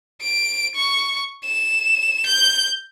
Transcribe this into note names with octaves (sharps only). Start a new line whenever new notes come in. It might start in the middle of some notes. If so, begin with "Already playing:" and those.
D7
C#6
E7
G6